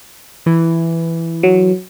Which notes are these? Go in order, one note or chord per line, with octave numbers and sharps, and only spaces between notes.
E3
F#3